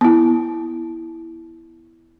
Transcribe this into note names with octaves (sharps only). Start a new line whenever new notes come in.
B3 E4